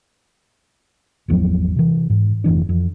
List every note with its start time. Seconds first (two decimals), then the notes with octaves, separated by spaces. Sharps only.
1.28 G#1 E2 F3 F#3
1.76 C3 E3
2.10 G#2
2.44 F1 D#2 E3 D4
2.69 F2